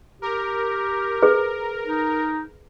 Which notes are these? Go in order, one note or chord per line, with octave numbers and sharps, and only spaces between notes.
G4 A#4
G#4 B4
D#4